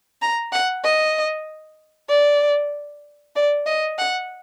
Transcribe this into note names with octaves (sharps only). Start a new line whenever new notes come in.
A#5
F#5
D#5
D5
D5
D#5
F#5